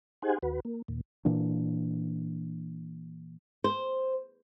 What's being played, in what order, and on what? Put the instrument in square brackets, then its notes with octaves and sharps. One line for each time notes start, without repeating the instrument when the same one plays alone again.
[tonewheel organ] D#4 G4 G#4 C5 F#5 G#5
D#2 F#4 B4
A#3
D#2 A#2
[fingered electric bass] A#2 E3 A#3 D4
[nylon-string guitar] C5